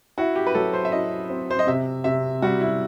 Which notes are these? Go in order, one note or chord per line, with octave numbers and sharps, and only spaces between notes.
E4 F#4
G4
B4
F#3 A4
C5
E5
E4 D#5
C4
C5
D#5
C3 E5
C3 E5
G3 F#4
E4